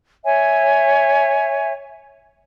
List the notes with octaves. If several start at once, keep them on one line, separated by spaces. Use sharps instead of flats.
C#5 E5 G#5